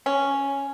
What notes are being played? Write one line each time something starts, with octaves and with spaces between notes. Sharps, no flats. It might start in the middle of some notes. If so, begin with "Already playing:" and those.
C#4